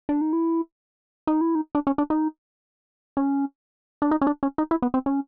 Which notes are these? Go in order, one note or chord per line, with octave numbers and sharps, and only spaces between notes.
D4
D#4
E4
D#4
E4
D#4
D4
C#4
D4
D#4
C#4
D4
D#4
C#4
D4
C#4
D#4
E4
B3
C4
C#4